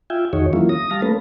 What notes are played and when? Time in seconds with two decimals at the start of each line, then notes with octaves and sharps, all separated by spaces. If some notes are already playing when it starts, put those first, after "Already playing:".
0.10 F4 E5 G5 G#5
0.33 E2 D#3 D#4 F#4 G#4 C#5
0.53 E3 F#3 A#3 C#4 E4 F4
0.69 D#6 A#6
0.91 G3 F5 A5 A#6
1.02 A3 A#3 C#4 A4 B4